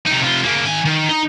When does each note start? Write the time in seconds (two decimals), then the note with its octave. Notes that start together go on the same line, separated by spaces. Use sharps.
0.07 C3 D#4
0.22 C3 F4
0.44 C#3 A#3
0.66 D#3 G#5
0.86 D#3
1.09 D#4